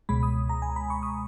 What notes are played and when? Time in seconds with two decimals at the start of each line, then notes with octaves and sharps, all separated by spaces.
0.09 C#2 B2 G#3 B5
0.23 D#6
0.49 A#5
0.62 G#5
0.76 B5
0.90 C#6
1.03 D#6